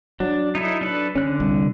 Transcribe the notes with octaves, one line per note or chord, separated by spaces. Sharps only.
F#3 D4
D#4 E4 A4
D4 A4 B4
D3 C#4 F#6
C2